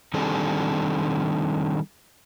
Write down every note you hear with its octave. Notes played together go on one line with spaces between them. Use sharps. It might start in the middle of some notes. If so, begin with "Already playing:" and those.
D#3 G3 C4 D4 G#4 A4